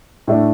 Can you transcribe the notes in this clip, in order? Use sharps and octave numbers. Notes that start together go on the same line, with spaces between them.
A2 A3 D4